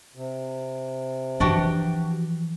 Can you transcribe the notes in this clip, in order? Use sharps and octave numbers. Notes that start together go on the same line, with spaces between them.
C3
E3 F3 D4 F#4 G4